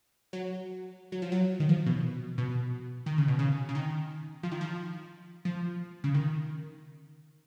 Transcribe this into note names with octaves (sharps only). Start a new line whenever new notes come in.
F#3
F#3
F3
F#3
D#3
F3
B2
B2
D#3
C#3
B2
C#3
C#3
D#3
F3
D#3
F3
F3
C#3
D#3